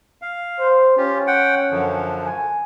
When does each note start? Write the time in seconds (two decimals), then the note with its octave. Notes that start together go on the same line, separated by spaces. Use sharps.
0.22 F5
0.59 C5
0.97 C#4 F4 G4
1.27 F#5 G5
1.71 F#2 D3 F3
2.25 G#5